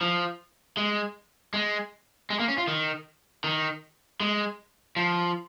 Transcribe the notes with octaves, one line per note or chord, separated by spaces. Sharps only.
F3
G#3
G#3
G#3
A#3
C#4
F4
D#3
D#3
G#3
F3